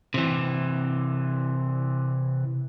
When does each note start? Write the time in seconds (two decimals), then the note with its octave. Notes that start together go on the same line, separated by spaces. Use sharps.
0.14 C3 E3